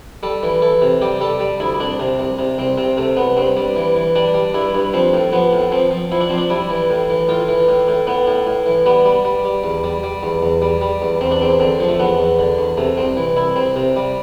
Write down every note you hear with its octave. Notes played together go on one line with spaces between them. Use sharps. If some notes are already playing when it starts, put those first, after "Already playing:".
G3 A4
E3
E3 A4
C3
G3 G4
G3 A4
G3
D2 E4
C2 D4
C3
C2
C3
C2 C4
C3 C4
C3 A3
C2 B3
G2 C4
G3
E3
E3
G3 D4
G3
G2 E4
G2
F3 C4
A2
F3 B3
A2
F3 C4
F3
F3 E4
D4
F3 C4
D4
G3 E4
E3
A2
E3
A2 F4
E3
A2
A2
A2 B3
A2
A2
E3
G3 B3
G3
G3
G3
E2
G3
G3
E2
E2
G3
G3
E2
E2 C4
D4
E2 C4
D3 C4
F3
A3
E2 B3
E2
D3
E2
C3 A3
C2 C4
E3
C2 E4
C2 C4
C3
G3